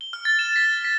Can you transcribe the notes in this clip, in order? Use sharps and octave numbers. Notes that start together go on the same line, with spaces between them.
G7
F6
A6
E7
B6
B6